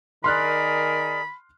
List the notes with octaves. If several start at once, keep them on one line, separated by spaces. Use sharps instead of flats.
D#3 G#4 A#4 D5 B5 C6 F6 F#6